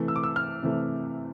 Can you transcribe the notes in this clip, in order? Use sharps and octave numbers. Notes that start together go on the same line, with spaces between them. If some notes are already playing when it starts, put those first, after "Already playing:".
Already playing: C3 E3 A3
E6
D6
E6
F6
C3 E3 A3